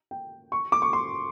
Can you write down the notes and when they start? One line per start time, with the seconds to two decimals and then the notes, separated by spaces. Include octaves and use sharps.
0.11 G5
0.52 C#6
0.72 D6
0.82 C#6
0.93 C6